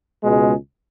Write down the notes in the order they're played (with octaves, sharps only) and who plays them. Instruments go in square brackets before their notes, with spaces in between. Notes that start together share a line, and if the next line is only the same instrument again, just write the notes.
[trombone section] C#2 B2 G#3